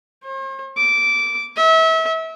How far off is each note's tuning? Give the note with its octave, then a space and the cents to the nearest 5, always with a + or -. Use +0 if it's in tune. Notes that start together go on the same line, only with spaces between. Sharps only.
C5 +45
D6 -15
E5 -30